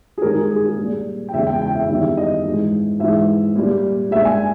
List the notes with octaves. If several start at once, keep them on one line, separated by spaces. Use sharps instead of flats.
G#4
G2 D#3 G#3 A#4
G#4
G#4
G#4
A#2 G3
G5
E2 C#3 E3 G#3 E5
G5
G5
E5
E2 D#3 G3 E5
D#5
G#2 E3 G#3
G#2 E3 G#3 E5
A#2 G3
A#2 G#3 E5
G#5